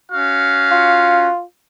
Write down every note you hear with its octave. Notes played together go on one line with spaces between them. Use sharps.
C#4 F#4 F5
F4